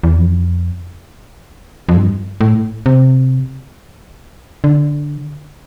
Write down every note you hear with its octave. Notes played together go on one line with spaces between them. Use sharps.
E2
F2
F2
G2
A2
C3
D3